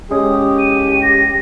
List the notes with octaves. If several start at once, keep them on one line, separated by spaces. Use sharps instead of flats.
G#3 C#4 G4 D#6
D#7
A#6